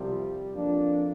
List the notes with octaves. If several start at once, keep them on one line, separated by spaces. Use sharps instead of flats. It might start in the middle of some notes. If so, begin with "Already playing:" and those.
Already playing: C2 C3 F3 G3
F2 F3 A#3 D4